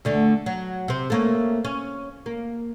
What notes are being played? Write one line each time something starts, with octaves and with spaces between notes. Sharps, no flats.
D2 D3 A3
F#3
C3 C4
A3 A#3 C#4
C#4
A#3